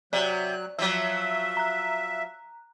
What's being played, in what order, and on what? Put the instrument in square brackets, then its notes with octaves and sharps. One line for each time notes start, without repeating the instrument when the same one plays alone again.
[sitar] C3 [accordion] F#3 F#6 [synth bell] D5
[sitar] F3 F#3 [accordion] E5 [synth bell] E6
[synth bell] A#5 F#6